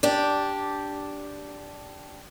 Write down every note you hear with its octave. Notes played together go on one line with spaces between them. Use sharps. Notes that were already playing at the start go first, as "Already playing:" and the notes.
D4 G4